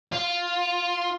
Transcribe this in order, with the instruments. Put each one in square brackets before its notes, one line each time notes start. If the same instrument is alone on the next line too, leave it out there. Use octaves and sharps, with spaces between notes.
[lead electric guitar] F4